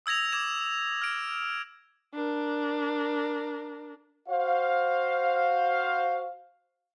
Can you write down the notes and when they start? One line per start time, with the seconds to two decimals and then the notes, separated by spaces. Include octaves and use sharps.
0.06 D#6 E6 G#6 A#6 F7
0.32 D6 G#6 E7
1.01 F6 D7
2.14 D4 A#4
4.28 F#4 C5 F5